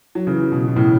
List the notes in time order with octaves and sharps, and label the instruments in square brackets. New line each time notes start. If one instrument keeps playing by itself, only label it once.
[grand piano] F#3
C#3 E3
B2
B2
A2 C#3